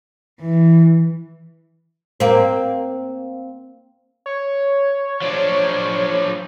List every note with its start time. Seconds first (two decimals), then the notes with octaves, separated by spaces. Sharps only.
0.41 E3
2.20 A#3 C4
4.26 C#5
5.22 F3 D4